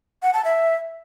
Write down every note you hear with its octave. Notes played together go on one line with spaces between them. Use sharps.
F#5
A5
E5